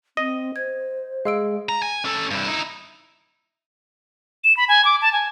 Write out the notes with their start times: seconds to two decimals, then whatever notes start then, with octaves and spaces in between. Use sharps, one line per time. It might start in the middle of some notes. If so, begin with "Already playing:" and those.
0.17 C4 D#5
0.56 C5 G#6
1.25 G#3 F5 E6 D7
1.69 A#5
1.82 G#5
2.05 C#4 A4
2.31 G2 E4
2.48 D#4 E4
4.44 E7
4.57 B5
4.68 G#5
4.85 D6
5.01 A5
5.12 G#5